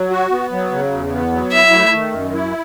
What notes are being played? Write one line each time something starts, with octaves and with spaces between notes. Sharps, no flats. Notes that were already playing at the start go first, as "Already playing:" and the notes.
Already playing: F#3
F#4
B3
F#3
C#3
E2
B3
F#3
E4 E5
A3
D#3
F#2
E4